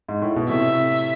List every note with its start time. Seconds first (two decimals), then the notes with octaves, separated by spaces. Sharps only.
0.09 G#2
0.22 A2
0.36 B2
0.49 A2 C3 E5